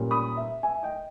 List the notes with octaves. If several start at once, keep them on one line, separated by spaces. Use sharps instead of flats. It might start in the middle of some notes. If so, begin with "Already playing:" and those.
Already playing: A#2 G3 A#3 C#4
B5 D#6
E5
E5 G#5
D#5 G5